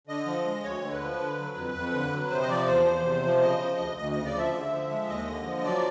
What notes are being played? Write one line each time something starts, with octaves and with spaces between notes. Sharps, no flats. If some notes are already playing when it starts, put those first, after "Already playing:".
D3 D#5
F3
G#3
D2 C#5
D3
B4
F3
D3
F#3
F2
F2
D3
F#3
C3 C5
D#5
F3 D5
E2 C5
E2
C3
F3
C#3 D#5
F3
D2
D2 D#5
C#3 D#5
D5
F3 E5
D3
F3
G#3
D#2 D#5
D3
F3
F#3 D5